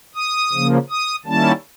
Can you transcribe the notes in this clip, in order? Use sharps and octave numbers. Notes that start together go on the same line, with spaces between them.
D#6
C#3 F3 A#3
D#6
D#3 G3 A#3 C#4 E4 A5